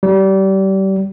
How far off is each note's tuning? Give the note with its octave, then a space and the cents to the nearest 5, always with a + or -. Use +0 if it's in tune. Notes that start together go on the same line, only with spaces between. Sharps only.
G3 -30